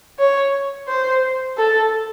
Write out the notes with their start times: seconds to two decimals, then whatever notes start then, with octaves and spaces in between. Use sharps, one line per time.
0.19 C#5
0.88 C5
1.57 A4